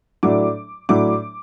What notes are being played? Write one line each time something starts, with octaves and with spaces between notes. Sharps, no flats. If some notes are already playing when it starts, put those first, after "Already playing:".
A2 F#3 A3 D4 D6
A2 F#3 A3 D4 D6